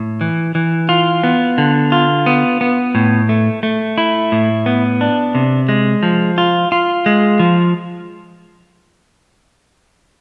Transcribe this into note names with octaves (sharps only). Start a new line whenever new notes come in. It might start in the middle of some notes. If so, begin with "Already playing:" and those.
Already playing: A2
E3
E3
F4
B3
D3
F4
B3
B3
A2
A3
A3
E4
A2
B3
D4
C3
G#3
F3
F4
F4
G#3
F3